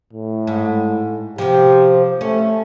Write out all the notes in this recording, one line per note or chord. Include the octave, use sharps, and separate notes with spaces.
A2
G#2
C3 F3 G4
A3 C#4